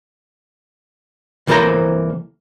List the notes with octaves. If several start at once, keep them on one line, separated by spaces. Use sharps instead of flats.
C2 E3 A#3 A4 C5 A#5